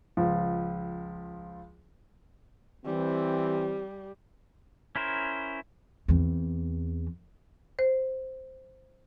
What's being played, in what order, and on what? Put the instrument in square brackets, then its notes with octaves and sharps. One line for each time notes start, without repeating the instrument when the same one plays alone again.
[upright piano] C#2 F3
[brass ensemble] E3 C4 [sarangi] G3
[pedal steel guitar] C#4 E4 A#4 C5
[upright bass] E2 C4
[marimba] C5